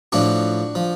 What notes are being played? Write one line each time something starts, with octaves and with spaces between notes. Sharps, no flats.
A2 F3 D4 F#4
F3